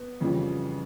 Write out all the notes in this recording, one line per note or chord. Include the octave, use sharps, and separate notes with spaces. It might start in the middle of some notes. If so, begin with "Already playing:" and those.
Already playing: B3
F2 C#3 E3 G3